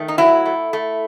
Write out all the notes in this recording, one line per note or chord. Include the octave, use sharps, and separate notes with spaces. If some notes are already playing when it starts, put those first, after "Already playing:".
Already playing: D#3 A3
D#4
F#3 E4
A3
A3